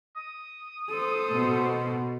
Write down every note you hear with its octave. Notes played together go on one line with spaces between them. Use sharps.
D#6
A4 C5
B2